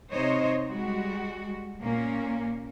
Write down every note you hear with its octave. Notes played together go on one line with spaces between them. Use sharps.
C3 D#4 C5 C#5 D#5
G3 G#3 F#4
A#2 A#3 C#4